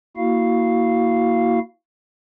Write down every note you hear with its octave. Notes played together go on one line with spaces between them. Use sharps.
A#3 E4 F#4 F5